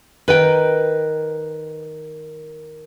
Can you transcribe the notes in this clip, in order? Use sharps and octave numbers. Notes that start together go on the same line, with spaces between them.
D#3 A#4 B4 G5